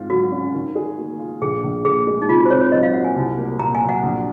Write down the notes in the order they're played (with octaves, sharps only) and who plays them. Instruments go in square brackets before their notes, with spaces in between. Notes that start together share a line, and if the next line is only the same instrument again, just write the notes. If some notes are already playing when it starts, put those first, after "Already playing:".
Already playing: [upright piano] G#2 C4 F4
[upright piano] F#3 [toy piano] F#4
[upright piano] C#4
D#3
G#4
A#3
F4
[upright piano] A#1 [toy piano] G#4
[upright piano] A#1
[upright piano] A#2 [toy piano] G#4
[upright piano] G#3
[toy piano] D#4
[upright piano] C3 [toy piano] F4
[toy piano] F#4
C5
[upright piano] C3 [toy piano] C#5
[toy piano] C#5
[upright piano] F#3 [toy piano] D#5
[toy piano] F5
[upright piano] A#3 [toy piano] F#5
[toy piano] G#5
[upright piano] C2
A#3
[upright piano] A#2 [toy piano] A#5
[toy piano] G#5
[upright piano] F#3
[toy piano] F#5
[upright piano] A#1